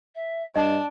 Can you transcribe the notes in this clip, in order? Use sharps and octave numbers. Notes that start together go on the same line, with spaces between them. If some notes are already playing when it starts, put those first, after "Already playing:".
E5
G2 D4 D#5 A5